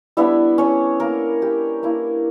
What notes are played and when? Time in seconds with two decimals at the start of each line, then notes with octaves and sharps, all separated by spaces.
0.17 G3 B3 D4 E4 E5
0.58 C#4 C#5
1.00 A#3 A#4
1.42 G4
1.83 A#3 E4